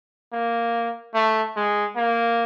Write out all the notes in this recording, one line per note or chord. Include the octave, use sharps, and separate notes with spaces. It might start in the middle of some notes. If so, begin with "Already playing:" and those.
A#3
A3
G#3
A#3